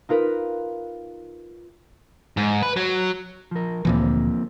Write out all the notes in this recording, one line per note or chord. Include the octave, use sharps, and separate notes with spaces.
D#4 F4 A#4 B4
G#2
B4
F#3
F3 A#4
D2 A#2 E3 F3 A#3 C4